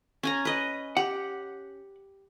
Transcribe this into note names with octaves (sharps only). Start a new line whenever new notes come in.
C#4 G#5 A#5
B4 D#5
G4 F#5